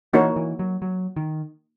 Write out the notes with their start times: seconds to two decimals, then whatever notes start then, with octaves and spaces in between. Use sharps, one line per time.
0.13 E3 A#3 D#4 F#4 A#4 C#5
0.36 E3
0.59 F#3
0.82 F#3
1.16 D#3